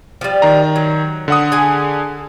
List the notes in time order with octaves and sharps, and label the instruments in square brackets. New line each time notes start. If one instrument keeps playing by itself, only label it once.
[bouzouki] F3 G3
[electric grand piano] D#3 A#5
[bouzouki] F#3
[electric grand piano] D3 F#5 D#6
[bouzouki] G#4 G#5